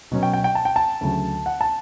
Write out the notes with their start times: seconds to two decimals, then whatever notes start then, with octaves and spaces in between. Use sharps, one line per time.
0.12 B2 F#3 C#4
0.23 G5
0.33 G5
0.44 G5
0.55 A5
0.65 G5
0.76 A5
1.01 D2 C#3 F#3
1.46 F#5
1.61 A5